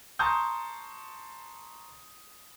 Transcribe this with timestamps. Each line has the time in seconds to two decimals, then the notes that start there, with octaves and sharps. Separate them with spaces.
0.19 A5 A#5 C6 C#6 D#6 G6